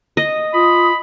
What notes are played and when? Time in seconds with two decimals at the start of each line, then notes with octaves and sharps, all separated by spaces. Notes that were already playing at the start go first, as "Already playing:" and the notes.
0.17 D#5
0.54 F4 B5 D#6